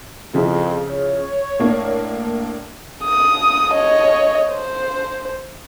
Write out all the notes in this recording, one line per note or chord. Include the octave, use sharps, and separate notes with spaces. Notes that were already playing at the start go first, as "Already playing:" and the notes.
F2 C#3 F3 E4
C#5
A2 A#3 D4
D#6
C#5 D#5
C5